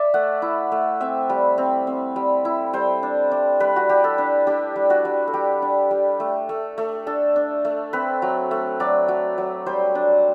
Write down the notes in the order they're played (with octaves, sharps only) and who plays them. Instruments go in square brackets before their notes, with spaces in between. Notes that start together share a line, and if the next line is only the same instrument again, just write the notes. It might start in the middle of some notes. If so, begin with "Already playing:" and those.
Already playing: [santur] D5 E5
A3 F#5
E4
A3
C4 E5
G3
C4
C4
G3
E4
G3 C5
D4
D4
G3 B4
F#4
G3 G4
A4
D4
D4 G4
G3
F#4
G3
A4
G3 G4
D4
G3
A3
A3
A3
D4 A4
D4
A3
C4 B4
F#3
A3
F#3 D5
F#3
F#3
G3 C5
D4